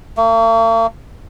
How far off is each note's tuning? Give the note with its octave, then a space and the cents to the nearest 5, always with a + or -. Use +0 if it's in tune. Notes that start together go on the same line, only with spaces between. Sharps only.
A#3 -45